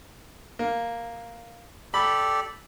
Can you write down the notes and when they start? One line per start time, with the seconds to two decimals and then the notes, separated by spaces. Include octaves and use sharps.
0.59 A#3
1.94 G4 A4 D5 B5